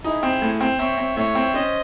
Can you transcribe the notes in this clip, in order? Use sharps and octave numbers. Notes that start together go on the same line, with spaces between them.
D#4 E4 G#4
C4
A2
C4
C4 C#5 E5
C4
A2 C#5 E5
C4
C#4 C5 D#5